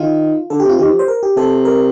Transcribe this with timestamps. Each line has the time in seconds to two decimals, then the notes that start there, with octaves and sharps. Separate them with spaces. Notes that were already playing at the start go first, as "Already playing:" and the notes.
Already playing: D#3 F4
0.50 D3 A4
0.60 G4
0.65 C3 F4
0.79 D#3 G4
0.89 F3
0.99 C5
1.08 A#4
1.23 G4
1.37 C3 A4
1.65 A#4